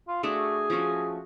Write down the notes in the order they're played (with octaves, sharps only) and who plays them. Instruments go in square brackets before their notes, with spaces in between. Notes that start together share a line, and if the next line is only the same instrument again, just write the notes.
[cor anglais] F4
[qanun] A3 D4 F#4 [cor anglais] G#4
[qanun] F3 A3 C#4 F#4